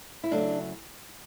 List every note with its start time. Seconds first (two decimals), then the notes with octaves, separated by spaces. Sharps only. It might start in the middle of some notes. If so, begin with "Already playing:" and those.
0.24 E4
0.31 C#3 F#3 A3 D4